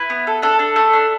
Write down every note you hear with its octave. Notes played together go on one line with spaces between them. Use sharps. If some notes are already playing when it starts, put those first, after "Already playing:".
Already playing: E4 B4
B3
A4
D4 A4
D4
A3
D4